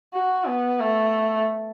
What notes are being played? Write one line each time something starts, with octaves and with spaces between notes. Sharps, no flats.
F#4
B3
A3